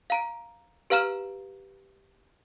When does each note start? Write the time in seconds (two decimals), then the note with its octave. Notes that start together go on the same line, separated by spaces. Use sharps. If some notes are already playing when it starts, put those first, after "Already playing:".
0.10 F5 A#5 D7
0.90 G4 B4 F5 A#5 F6 E7